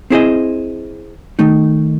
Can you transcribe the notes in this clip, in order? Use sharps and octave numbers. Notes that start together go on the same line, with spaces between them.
C4 E4 G#4 C5 D#5
D#3 A3 D#4